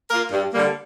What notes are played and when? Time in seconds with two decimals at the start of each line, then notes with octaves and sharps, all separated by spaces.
0.10 A#3 F4 A#4
0.32 G2
0.53 D3 G3 A#3